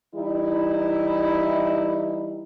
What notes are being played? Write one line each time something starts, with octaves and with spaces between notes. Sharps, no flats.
E3 G3 D#4 E4